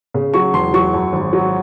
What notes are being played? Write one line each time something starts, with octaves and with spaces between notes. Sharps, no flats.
C#3
F#3 C#6
E1 C6
F#3 C#6
F#2
G#1
F#3